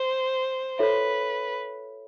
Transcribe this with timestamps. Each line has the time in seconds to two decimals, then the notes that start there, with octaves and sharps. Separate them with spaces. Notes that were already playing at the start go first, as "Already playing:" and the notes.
Already playing: C5
0.79 F4 A4 B4 C#5 E5